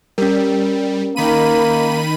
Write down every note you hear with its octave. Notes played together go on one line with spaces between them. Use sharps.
G3 C#4 A#4
D#3 A#3 B5 D#7